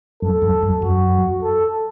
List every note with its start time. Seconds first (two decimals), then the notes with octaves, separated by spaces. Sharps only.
0.22 F#2 A4
0.42 F#2
0.63 F#2
0.82 F#2 F#4
1.43 A4